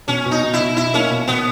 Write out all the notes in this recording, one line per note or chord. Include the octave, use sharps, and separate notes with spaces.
B2 C#4
B2
D#4
B2
E4
B2
D#4 E4
A#3 C#4
B2
B2 B3